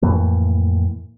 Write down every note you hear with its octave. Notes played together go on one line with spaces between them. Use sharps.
F2 A2 E3 A#3